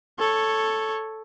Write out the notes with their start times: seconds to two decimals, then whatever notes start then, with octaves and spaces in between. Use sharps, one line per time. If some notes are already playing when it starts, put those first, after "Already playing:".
0.19 A4 C#5